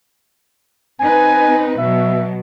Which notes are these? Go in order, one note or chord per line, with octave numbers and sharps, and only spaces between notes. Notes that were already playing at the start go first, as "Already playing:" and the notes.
C4 D#4 B4 G#5
B2 F#3 E5